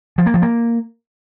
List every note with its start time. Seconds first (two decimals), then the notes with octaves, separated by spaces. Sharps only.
0.18 F3
0.26 A#3
0.34 F3
0.42 A#3